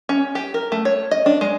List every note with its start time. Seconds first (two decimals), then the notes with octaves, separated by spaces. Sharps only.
0.09 C#4
0.35 G4
0.54 A#4
0.72 A3
0.85 C#5
1.11 D#5
1.26 D4
1.41 G#3